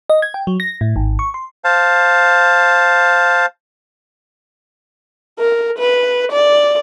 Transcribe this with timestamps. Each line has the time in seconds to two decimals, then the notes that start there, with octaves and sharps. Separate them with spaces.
0.10 D#5
0.22 G#6
0.34 G5
0.47 F#3
0.60 A#6
0.81 A2
0.96 G#1
1.19 C#6
1.34 C6
1.64 C5 F5 A5
5.39 A#4
5.79 B4
6.32 D5